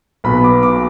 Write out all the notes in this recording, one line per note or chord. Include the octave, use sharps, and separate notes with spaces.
B1 B2 B3 B5
D6
D6